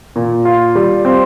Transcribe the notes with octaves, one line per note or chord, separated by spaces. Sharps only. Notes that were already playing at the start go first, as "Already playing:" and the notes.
A#2
F4
G3
C4